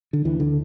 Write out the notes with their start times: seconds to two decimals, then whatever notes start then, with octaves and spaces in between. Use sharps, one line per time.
0.13 D3
0.25 D2 D3 E3
0.40 D3